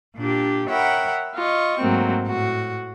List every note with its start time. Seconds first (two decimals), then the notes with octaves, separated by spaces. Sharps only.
0.16 A#2 D4 G4
0.69 A#4 C#5 E5 F#5 G5 B5
1.34 F4 D#5 C#6
1.79 G#2 F#3 A3 A#3 C4
2.25 A2 F#4